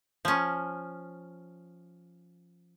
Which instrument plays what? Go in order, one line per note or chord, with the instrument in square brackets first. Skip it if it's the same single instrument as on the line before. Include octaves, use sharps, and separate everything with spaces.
[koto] F3 C#4